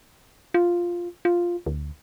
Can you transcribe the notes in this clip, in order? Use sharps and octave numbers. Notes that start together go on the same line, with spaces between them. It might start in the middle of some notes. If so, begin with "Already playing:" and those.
F4
F4
D2